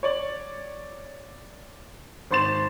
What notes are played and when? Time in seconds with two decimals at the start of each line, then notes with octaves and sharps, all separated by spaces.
0.03 C#5 D5 F#7
2.31 G#1 C5 C6 A6 E7